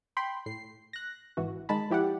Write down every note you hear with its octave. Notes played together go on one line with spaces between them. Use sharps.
G5 B5 C6
A2 C7
F#6 A#6
G#1 E3 F#4
D#3 G#3 A5 B5
F3 E4 G4 D5 F#5